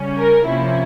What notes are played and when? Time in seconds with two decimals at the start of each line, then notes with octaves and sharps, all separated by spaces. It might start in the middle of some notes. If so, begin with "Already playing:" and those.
Already playing: C#3 G3 C#4
0.19 A#4
0.47 C3 F3 A#3 C#4 E4